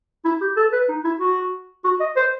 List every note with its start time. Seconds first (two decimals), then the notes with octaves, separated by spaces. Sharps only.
0.25 E4
0.41 G4
0.57 A4
0.73 B4
0.89 D#4
1.05 E4
1.20 F#4
1.85 F#4
2.00 D#5
2.17 C5